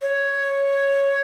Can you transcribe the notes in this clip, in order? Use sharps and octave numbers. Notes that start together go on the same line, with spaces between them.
C#5